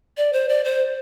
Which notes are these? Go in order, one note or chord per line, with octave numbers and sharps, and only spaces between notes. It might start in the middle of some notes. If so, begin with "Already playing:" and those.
D5
C5
D5
C5